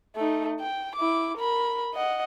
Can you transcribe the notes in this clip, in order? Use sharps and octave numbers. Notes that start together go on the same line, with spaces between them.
A3 D#4
G5
E4 D6
A#4 B5
D#5 F#5